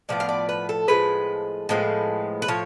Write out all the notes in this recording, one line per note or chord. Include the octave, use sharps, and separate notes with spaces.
A2 F3 B3 D5
F5
D5
B4
A4
A2 F3 G#3 B4
A2 F3 G#3 B3
B4
A2 F3 C#5